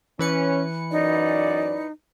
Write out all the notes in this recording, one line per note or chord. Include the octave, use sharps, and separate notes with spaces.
E3 C#4 B4 C#7
F#2 D#4 D5